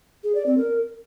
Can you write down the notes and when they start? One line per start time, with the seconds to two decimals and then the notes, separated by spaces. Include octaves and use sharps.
0.24 G#4
0.35 D5
0.46 C4
0.57 A#4